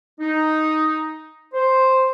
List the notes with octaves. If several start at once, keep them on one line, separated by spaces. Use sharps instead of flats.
D#4
C5